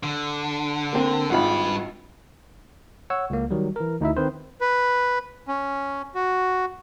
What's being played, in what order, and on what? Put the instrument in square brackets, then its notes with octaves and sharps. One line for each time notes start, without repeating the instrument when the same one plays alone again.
[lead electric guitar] D3
[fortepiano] A#3 C4
[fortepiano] G#1 F4 F#5 [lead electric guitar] G2 B5
[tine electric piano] C#5 F#5 E6
C#2 A#3
D#3 F#3 G3
E3 A#4
D2 D#4 E4 E5
D#3 C4 B4 C5
[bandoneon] B4
C#4
F#4